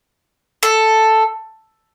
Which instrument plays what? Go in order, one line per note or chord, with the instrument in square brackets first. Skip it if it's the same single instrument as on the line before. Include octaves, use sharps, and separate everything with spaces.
[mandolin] A4